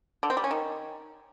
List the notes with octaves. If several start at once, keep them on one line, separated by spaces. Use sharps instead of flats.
D3
C4
G3
C#4
D#3